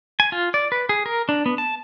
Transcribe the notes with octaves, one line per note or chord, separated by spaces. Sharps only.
G#5
F4
D5
B4
G#4
A#4
D4
B3
A5